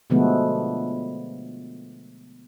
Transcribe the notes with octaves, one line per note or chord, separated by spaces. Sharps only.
B2 D3 F3 G#3 A3 B3